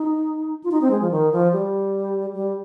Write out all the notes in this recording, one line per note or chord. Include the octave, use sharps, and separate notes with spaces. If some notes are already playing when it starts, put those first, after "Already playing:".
Already playing: D#4
F4
D#4
C4
G#3
F3
D#3
F3
G3
G3